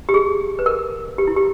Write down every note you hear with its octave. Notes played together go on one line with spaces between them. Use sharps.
G4
G#4
B4
A#4
G4
E4
G4